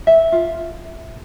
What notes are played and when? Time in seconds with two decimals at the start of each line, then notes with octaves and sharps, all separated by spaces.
0.07 E5
0.32 F4